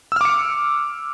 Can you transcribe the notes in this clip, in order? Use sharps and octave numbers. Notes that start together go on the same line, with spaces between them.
D6 E6 F6 C#7